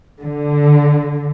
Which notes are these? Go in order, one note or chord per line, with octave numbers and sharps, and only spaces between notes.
D3